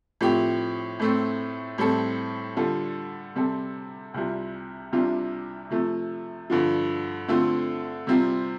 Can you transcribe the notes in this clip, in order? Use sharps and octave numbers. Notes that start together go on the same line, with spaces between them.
A2 F3 C4 G4
A2 A3 C4
A2 G3 C4 A4
D3 G3 F4 A4
C3 G3 C4 A4
C2 C3 G3 F4
C2 C3 G3 D4 F4
C3 F3 A3
G2 D3 F3
D3 A3 C4 F4
C3 G3 C4 F4